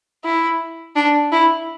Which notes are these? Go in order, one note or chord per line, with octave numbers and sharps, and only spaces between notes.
E4
D4
E4